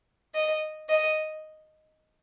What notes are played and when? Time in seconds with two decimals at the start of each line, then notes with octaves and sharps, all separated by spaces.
0.35 D#5
0.89 D#5